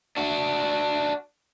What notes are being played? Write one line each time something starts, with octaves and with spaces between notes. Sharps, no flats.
D4 F#4